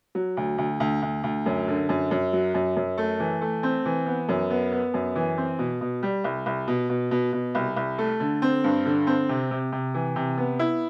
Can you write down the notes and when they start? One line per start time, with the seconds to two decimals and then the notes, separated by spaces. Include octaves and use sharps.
0.15 F#3
0.37 D2
0.58 D2
0.80 D2
1.02 D2
1.24 D2
1.46 F#2
1.68 D3
1.89 F#2
2.11 F#2
2.33 F#3
2.54 F#2
2.76 F#2
2.98 A3
3.20 E3
3.41 A3
3.63 C4
3.85 E3
4.06 B3
4.29 F#2
4.50 B3
4.72 B3
4.94 F#2
5.15 E3
5.38 C4
5.59 B2
5.81 B2
6.03 G3
6.24 C2
6.46 C2
6.68 B2
6.90 B2
7.11 B2
7.33 B2
7.55 C2
7.76 C2
7.98 A3
8.20 D3
8.42 C4
8.64 G2
8.86 D3
9.07 C4
9.29 C3
9.51 C3
9.72 C3
9.94 E3
10.16 C3
10.38 B3
10.59 E4